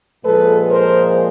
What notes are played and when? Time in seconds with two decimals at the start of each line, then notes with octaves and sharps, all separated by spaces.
0.24 A#2 F3 G#3 A4 B4
0.70 A#4 C5